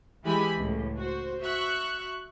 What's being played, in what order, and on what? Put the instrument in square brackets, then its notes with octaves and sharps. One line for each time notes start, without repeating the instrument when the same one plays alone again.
[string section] E3 G#3 E4 G4 G#5 B5
C#2 A2
F#4 C5
F#4 E5 C#6 F#6